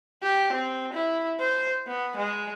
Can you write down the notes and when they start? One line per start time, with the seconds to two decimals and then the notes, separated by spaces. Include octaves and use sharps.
0.23 G4
0.53 C4
0.93 E4
1.40 C5
1.87 B3
2.17 G#3